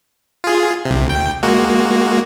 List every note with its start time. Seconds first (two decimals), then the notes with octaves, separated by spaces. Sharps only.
0.44 F4 G#4
0.85 C2 C3
1.07 D2 G5
1.43 G#3 A#3 F#4